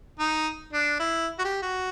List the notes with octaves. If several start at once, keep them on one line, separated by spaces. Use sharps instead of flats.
D#4
D4
E4
F#4
G4
F#4